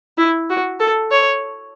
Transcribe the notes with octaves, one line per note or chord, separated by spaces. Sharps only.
E4
F#4
A4
C#5